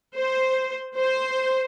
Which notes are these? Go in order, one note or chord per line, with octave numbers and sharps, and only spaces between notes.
C5
C5